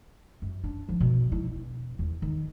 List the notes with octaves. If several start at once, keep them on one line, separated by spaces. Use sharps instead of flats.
F#2
D4
F3
B2
E4
E1
E2
D#3